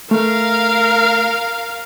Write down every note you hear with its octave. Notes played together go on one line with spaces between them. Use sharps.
A3 A#4 F5